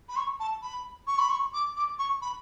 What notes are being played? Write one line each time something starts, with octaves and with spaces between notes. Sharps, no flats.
B5
C#6
A5
B5
C#6
B5
C#6
D6
D6
C#6
B5